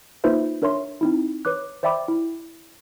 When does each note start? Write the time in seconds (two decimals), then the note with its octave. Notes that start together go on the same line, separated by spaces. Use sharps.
0.24 A#3 D#4 F4 B4 C5 E5
0.62 D4 A#4 C#5 E5 C6
1.01 C4 D#4 E4
1.45 B4 C#5 D6 F#6
1.83 C5 D5 E5 G5 B5 D6
2.08 E4